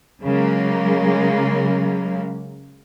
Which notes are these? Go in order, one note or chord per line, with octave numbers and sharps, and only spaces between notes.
C#3 F#3 G#3 A#3